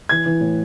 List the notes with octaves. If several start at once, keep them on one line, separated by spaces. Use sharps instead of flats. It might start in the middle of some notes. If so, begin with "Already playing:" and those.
E3 G#6
E3
A2